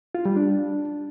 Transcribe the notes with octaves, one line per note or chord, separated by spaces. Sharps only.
F4
G3
D4